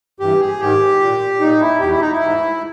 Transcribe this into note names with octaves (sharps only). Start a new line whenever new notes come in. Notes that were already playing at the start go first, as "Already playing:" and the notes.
G2 E3 G4
G#4
G#2 D#3 G4
A#2
A#2 D#4
E4
E2 B2 G4
E4
D#4
E4
G#2 E3